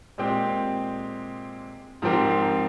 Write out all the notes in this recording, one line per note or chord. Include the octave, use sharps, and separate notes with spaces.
A#2 G#3 C4 G4
G#2 F3 C4 G4 A#4